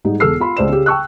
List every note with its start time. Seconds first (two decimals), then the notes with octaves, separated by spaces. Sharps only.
0.05 G#2 G3 D#4
0.20 E1 G#4 A4 E6 F6 C7
0.40 F4 B5 C6
0.57 C#2 C5 D5 E7
0.69 C#3 G4
0.86 G5 A5 C#6 E6 F#6